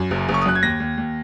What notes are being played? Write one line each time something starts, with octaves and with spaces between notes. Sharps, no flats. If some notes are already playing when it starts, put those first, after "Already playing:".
Already playing: F#2
F#1
F#1
C#6
D#6
F#2 F#6
G#6
D#2 A#6
D#2
D#2